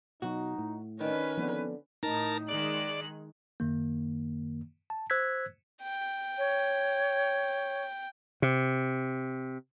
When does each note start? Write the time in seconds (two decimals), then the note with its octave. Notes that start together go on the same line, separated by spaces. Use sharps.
0.22 B2 F#3 D#4 F#4
0.58 A2
1.01 D#3 C#4 D4 B4
1.37 D3 F3 B3 C4
2.03 A2 D#4 A#4 A5 A#5
2.49 D#3 G#3 D5 F#6
3.60 F#2 D#3 A#3
4.90 A5
5.10 C5 E6 F#6 G#6 B6
5.83 G5
6.38 C#5
8.42 C3